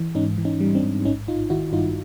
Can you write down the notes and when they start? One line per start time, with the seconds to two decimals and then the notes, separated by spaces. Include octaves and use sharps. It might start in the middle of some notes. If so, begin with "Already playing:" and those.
Already playing: E3
0.15 G#2 C#4 D#4
0.38 E3
0.45 C#4 D#4
0.60 G3
0.75 C4 D4
0.83 G#2
1.05 A1 C#4 D#4
1.28 A1 D#4 F4
1.50 D#3 E4 F#4
1.73 G2 D#4 F4